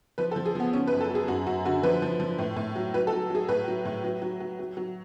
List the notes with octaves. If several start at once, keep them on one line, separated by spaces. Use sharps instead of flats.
F3 B4
A4
F3
G#4
F3 B3
C#3 C#4
B4
F#2
A4
F#3
G#4
F#2 F#4
F#2 F#4
D3 F#4
F3 B4
F3
F3
A2
A2
F#3
F#3 B4
A4
F#3
F#3 G#4
A2 B4
F#3
A2
F#3
F#3
F#3
F#3
F#3